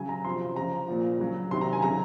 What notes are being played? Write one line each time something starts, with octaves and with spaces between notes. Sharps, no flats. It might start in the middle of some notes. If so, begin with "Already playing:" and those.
Already playing: C#3 F#3 G#5
A#5
C3 F3 C6
C#3 F3 A#5
A#2 F3
C#3 F#3
C3 D#3 F#3 C6
A#5
G#5
C#3 F#3 A#5